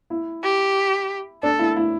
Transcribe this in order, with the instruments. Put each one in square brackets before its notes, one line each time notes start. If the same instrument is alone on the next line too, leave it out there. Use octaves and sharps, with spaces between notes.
[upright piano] E4
[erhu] G4
[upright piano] D4 [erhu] A4
[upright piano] E4
E4